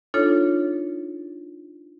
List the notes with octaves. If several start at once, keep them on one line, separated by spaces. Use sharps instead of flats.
D4 D#4 F4 A4 C#5